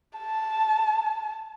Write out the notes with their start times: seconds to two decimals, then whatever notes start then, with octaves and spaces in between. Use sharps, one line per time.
0.19 A5